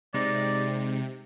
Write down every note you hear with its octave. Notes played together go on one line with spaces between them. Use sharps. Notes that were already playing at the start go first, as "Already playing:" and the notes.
C3 G#3 D#4 D5